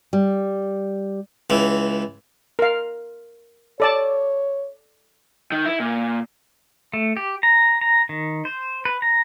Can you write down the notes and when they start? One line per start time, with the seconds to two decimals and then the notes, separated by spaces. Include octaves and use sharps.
0.13 G3
1.50 C#2 E3
2.59 A#4 F5
3.80 A4 C#5 D5 A5
5.52 D#3
5.66 E4
5.80 A#2
6.94 A3
7.17 G4
7.43 A#5
7.81 A#5
8.09 D#3
8.45 C5
8.85 B4
9.02 A#5